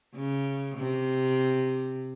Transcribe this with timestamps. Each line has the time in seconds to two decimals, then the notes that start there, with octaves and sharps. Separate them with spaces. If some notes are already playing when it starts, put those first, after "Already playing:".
0.15 C#3
0.77 C3